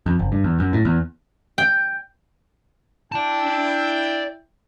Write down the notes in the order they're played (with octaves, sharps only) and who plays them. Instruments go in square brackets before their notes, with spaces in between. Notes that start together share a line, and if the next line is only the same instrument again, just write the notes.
[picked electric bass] F2
F#1
G2
E2
F#2
A2
E2
[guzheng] G5
[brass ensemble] E4 G5 [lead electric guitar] D5 A5